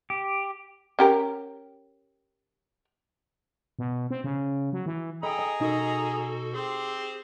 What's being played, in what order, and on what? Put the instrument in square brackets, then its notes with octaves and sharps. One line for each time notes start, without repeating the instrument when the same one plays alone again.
[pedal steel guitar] G4
[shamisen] C#4 G4 A#4
[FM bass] B2
C4
C#3
F#3
E3
[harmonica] G#4 A#5 D#6 [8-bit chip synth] A4 G5 [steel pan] D#5 B5
[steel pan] D#5
[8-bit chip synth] B2 F#4 A4 [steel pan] D#4 D#5
[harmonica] C4 G4 C5 [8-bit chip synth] G#4